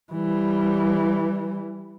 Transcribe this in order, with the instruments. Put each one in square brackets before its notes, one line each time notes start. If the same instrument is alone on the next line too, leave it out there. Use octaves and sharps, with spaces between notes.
[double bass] E3 G3